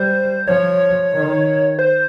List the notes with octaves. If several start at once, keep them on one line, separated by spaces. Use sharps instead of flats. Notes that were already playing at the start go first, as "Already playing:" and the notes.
Already playing: G3 C5
F3 C#5
D#3
C5